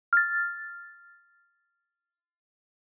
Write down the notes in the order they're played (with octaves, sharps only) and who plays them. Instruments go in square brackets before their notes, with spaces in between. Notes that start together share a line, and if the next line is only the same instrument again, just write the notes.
[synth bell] F6 A6